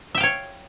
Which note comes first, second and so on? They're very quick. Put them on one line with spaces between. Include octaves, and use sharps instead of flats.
E5 G5 F5 C#5